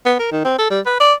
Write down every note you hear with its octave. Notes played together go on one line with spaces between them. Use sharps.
B3
A#4
D#3
C4
A4
G3
B4
D5